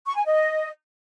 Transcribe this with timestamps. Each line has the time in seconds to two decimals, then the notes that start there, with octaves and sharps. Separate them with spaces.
0.06 C#6
0.15 G#5
0.25 D#5